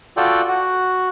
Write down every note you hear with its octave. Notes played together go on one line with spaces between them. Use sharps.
F4 F#4 A4 D5 G5
F#4